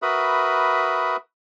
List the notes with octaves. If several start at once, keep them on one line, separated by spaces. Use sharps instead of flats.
F#4 A#4 B4 E5 B5 D#6